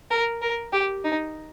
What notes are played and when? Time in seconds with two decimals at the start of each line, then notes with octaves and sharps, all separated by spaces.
0.11 A#4
0.42 A#4
0.73 G4
1.04 D#4